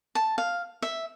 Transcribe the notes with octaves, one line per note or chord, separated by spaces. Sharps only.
A5
F5
E5